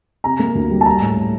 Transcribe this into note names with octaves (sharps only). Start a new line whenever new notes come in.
C3 A#5
A#3
D2
G3
A5
G3 A#5
A2
A2